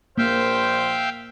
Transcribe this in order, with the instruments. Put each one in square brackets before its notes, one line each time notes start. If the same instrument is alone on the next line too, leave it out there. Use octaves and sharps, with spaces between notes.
[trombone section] A#1 C5 [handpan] A#3 [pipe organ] E5 F5 G5